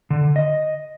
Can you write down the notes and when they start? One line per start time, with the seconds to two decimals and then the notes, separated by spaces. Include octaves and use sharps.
0.10 D3
0.36 D#5